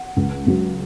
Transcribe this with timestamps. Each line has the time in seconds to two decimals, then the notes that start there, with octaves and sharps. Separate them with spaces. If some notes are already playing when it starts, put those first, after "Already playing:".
Already playing: F#5
0.17 C#2
0.47 C#3 F#3